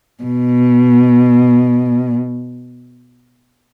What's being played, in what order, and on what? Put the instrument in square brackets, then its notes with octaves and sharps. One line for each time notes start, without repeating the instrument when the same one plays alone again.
[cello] B2